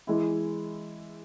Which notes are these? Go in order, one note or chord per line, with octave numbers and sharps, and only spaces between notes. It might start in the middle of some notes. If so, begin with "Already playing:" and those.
E3 G#3 E4